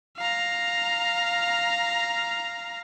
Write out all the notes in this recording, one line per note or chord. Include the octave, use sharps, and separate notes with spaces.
F5 A#5